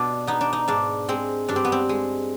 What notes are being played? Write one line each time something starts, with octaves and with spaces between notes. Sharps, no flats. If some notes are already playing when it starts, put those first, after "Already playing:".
Already playing: B2 D4
B3 D#4
D4
D#4
G#2 D4
G#3 C4
G2 D4
C4
B3
C4
G#3